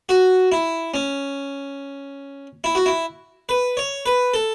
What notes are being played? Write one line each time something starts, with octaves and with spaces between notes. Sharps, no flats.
F#4
E4
C#4
E4
F#4
E4
B4
C#5
B4
A4